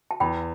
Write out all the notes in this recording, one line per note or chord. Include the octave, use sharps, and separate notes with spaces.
A5
E2 G5 B5